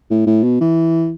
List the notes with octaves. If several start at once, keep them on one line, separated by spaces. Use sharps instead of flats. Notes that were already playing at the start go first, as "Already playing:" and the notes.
A2
A2
B2
E3